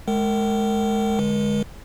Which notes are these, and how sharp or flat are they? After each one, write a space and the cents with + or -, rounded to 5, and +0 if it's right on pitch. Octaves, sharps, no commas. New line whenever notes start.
G#3 +25 A#4 -30 G5 -45
D3 +0 G#3 +0 A#4 +45